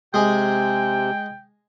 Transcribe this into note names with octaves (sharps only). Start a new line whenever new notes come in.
C3 G#3 G#4 G5